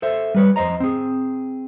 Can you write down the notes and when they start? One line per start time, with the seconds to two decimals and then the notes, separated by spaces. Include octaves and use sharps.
0.02 A4 C5 E5
0.35 G3 B4 C#5
0.56 F2 C5 D#5 A#5
0.80 C4 G#4